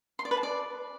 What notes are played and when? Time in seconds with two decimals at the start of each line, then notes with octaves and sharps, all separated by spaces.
0.19 C6
0.25 D5
0.31 B4
0.37 A5
0.43 D5